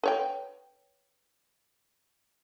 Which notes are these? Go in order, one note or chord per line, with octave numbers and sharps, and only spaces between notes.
B4 C#5 G5